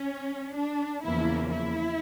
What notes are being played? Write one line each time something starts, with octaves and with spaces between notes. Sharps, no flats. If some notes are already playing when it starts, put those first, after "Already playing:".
Already playing: C#4
D4
E2 C#3 F3 A#3 E4
E4